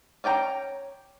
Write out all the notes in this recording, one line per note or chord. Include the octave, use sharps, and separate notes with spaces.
C#4 D5 G5 A#5